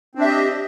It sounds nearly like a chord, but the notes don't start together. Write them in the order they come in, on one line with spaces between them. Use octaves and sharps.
C4 D4 E5 G4 D#5